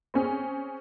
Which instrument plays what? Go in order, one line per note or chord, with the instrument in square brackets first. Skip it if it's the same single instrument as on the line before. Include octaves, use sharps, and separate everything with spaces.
[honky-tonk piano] C4 C#4 G#4